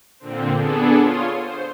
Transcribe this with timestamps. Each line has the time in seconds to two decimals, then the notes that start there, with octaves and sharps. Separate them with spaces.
0.20 A#2 D3 C4
0.53 B3 D4 G#4 A4
0.99 F4 C#5 C6 D#6
1.40 C5